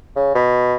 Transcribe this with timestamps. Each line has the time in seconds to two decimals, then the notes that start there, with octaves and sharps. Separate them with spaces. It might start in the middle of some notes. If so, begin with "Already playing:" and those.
0.16 C#3
0.35 B2